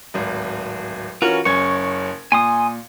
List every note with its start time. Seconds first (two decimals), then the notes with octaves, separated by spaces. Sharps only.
0.14 D1 G#1
1.22 E3 C#4 F4 F#4 A#4
1.45 F#1 C#4 C#6 G#6
2.32 A#2 G#5 C6 D#6